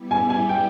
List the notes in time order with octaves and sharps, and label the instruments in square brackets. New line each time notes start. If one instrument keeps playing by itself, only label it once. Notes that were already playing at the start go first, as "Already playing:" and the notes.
Already playing: [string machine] G3 B3 E4 G4
[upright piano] G#5
G#5
G5